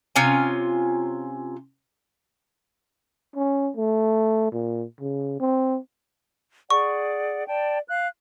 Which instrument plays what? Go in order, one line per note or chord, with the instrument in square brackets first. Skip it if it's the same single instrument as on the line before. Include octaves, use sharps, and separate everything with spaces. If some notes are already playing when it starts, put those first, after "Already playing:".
[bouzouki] C3 C#4 F4 G#5
[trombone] C#4
A3
A#2
C#3
C4
[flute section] G#4 D5 F#5 [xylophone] C#6
[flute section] D5 G5 A5
F5 F#6